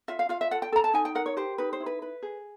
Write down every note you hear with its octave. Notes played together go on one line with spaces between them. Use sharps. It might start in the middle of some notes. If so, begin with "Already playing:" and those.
F4 E5
F5
F4 F5
E5
A4 F#5
G5
A4 A#5
A5
D#4 G#5
G5
A#4 F#5
C#5
G4 C5
D#4 B4
C5
E4
B4
B4
G#4